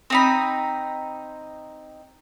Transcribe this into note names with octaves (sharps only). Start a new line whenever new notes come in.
C4 D#4 B5